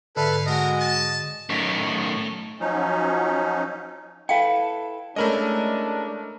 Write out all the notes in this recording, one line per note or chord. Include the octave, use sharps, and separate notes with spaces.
G#2 D3 E4 A4 B4 E5 F5
G#3 A3 F#4 A#4 D#5
A5
F#2 D#3 A3 C#5
F3 F#3 C#4 D#4
E4 A4 B4 F5 G5
G#3 A3 C#4 D4 E4 A#4 D#5